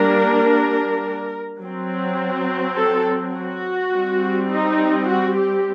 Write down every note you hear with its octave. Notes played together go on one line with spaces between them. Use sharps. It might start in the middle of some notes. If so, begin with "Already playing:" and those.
Already playing: G3 A#3 D4 A#4
F#3 C4
A4
F#4
G3 C4
D#4
F#4
G4